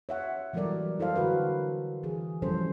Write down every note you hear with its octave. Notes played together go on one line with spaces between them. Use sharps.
C#5 E5 F#5
E3 F#3 G3 A4 A#4 D5
E4 A4 C5 F5
D3 F#4 A#4 B4
E3 G#4
E3 F3 G3 C#4 A4 C5